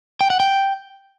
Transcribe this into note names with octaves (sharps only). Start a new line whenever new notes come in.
G5
F#5
G5